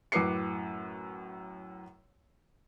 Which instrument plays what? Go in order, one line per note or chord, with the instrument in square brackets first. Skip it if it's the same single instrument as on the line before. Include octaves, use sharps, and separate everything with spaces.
[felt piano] F#2 A2 B4 D6 C7 C#7